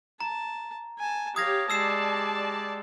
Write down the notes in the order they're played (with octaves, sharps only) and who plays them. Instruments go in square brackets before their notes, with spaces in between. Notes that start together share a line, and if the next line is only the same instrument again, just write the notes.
[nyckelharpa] A5 [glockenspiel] A#5
[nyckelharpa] G#5 A5
[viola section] G4 C#5 [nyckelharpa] F5 [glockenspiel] D#6 G#6 A#6
[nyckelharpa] G#3 G4 [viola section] D5 A5 [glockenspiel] E6 C7 E7